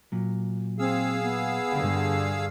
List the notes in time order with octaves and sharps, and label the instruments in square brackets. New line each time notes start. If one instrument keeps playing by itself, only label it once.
[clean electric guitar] A#2 F#3
[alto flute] C4 [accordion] G#4 F5 E6
[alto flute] B3
[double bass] G2 D3 [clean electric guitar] G4